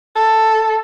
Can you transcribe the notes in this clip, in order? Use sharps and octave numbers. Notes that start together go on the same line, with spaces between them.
A4